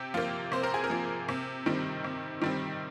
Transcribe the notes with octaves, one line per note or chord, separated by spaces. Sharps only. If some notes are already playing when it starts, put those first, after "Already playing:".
Already playing: C3 G4
F3 A#3 F4
C3 C5
A#4
G#4
A#4
F3 A#3
C3
D#3 G3 C4
C3
D#3 G3 C4